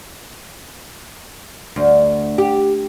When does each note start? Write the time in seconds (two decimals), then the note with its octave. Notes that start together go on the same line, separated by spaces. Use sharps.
1.76 D2
2.38 G4